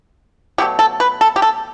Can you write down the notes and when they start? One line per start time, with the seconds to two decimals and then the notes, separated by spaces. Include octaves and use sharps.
0.58 B2 F#3 A3 G4
0.79 A4
1.00 B4
1.21 A4
1.36 G4
1.42 A4